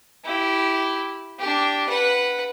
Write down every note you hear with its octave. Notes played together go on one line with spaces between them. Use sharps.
E4 G4
D4 G4
B4 F#5